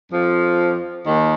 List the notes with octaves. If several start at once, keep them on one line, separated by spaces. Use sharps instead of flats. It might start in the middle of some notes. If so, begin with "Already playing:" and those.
F2 F3
D#2 D#3